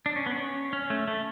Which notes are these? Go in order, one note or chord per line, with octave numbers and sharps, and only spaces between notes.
D4
C#4
B3
C#4
C#4
A3
A3